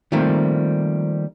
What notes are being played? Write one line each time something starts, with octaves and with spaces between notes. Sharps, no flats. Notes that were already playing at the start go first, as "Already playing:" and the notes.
D#3 F3 G3 A3 A#3 C4